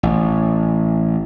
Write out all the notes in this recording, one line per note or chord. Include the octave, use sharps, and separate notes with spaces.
A1